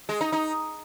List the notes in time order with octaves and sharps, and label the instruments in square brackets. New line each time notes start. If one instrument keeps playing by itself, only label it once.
[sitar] G#3
D#4
D#4